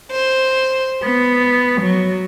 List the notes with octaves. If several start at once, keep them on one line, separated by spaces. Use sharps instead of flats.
C5
B3
F#3